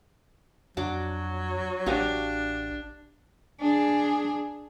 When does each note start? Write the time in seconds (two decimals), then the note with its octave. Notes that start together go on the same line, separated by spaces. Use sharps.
0.77 F2 F#3 D4 F#4 D6
1.86 A1 D4 F#4 G4 F5
3.61 D4 G#4